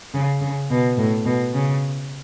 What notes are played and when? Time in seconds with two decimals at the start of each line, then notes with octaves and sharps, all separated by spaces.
0.14 C#3
0.41 C#3
0.70 B2
0.97 A2
1.26 B2
1.54 C#3